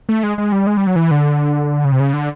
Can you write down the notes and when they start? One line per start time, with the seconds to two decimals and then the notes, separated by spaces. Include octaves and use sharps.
0.09 A3
0.23 G#3
0.38 G#3
0.52 G3
0.67 G#3
0.77 G3
0.87 F#3
0.96 E3
1.11 D3
1.85 C#3
1.92 C3
2.00 C#3
2.13 D3